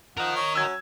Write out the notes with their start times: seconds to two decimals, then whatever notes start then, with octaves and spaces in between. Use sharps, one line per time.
0.18 F3 A#4 D#5 F#5
0.36 C#5
0.55 F#3 C#4 E6 G#6